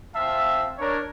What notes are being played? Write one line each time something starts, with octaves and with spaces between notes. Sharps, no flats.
C4 F4 E5 F5 A5
D4 A#4 C#5